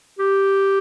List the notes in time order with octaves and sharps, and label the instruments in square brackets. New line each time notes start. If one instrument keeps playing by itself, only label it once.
[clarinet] G4